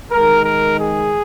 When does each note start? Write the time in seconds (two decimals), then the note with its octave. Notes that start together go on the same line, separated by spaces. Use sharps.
0.11 D#3 G#3 A#4
0.45 A#4
0.79 G#4